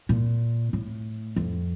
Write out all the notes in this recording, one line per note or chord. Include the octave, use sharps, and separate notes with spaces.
A#2
A2
F2